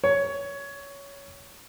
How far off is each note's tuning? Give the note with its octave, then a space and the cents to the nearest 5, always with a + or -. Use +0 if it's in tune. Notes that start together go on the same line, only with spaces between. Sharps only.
C#5 +15